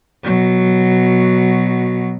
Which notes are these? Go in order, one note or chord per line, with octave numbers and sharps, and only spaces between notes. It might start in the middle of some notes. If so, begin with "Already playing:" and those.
B2 F#3